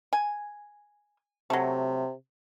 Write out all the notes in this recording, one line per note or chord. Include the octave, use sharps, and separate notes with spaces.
G#5
C3 F#3 A3